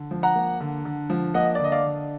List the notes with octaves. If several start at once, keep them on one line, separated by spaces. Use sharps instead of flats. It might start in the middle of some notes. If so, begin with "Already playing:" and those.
Already playing: D3
F3
F#5 A#5
A#3
D3
D3
F3
A#3 D#5 F#5
D5
D3 D#5
D5 F5
D3